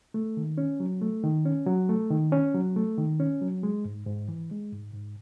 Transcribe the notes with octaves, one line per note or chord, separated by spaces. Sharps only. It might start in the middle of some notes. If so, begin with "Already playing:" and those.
A3
D#3
C#4
F#3
A3
D#3
C#4
F#3
A3
D#3
C#4
F#3
A3
D#3
C#4
F#3
G#3
G#2
G#2
E3
G#3
G#2
G#2